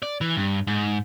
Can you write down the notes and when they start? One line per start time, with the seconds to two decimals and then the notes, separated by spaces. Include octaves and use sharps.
0.02 D5
0.21 E3
0.37 G2
0.67 G#2